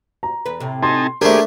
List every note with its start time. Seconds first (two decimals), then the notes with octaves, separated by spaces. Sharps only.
0.23 A#5
0.46 E2 B4
0.60 A2 C3
0.83 D#4 G#5 A5 C6
1.21 D#2 A3 D4 G4 G#4 A#4 C5 D5